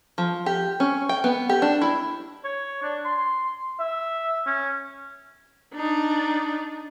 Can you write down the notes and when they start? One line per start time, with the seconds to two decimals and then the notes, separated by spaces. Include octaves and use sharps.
0.18 F3
0.46 G4
0.80 C#4
1.09 G5
1.24 B3
1.49 G4
1.62 D4
1.82 E4
2.44 C#5
2.83 D4
3.05 C6
3.80 E5
4.47 C#4
5.74 D4 D#4